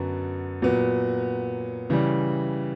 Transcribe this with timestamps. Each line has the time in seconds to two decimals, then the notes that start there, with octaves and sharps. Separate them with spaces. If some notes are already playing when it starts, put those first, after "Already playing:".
Already playing: F#2 D3 F#3 B3
0.62 A#2 F#3 B3
1.90 C#3 E3 G3